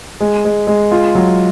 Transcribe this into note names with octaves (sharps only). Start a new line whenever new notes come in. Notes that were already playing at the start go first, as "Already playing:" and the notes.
G#3
G#3
G#3
F4
F#3